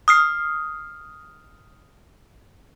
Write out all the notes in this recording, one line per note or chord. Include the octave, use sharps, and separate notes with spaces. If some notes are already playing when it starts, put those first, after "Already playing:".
D#6 F6 C7